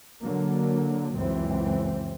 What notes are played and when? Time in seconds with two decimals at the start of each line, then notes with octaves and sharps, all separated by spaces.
0.21 D3 F#3 A#3
1.17 C#2 F#2 E3 C4